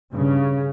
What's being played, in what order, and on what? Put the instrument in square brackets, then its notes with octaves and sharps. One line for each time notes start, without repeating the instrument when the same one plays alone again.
[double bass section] G2 C#3